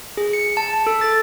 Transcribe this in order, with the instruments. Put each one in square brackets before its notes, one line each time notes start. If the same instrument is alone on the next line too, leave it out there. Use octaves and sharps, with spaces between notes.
[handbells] G#4
C#7
A5
A4
A6